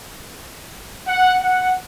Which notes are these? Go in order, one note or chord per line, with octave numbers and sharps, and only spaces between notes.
F#5
F#5